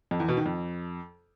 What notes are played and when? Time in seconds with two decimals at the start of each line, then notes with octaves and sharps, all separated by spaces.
0.11 F2
0.20 E2
0.28 B2
0.37 D#3
0.46 F2